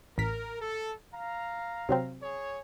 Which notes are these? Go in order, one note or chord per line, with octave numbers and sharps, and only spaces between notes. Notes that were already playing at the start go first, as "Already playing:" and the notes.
A1 A#4 B6
A4
F5 A#5
C3 F#3 C4
G#4 C#5